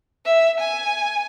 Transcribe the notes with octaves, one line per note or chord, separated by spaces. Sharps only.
E5
G#5